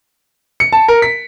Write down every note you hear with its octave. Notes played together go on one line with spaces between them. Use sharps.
C#7
A5
A#4
B6